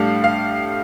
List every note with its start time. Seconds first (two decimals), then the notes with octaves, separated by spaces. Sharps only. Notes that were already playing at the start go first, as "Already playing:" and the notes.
Already playing: A2 G3 D4 F5
0.24 F5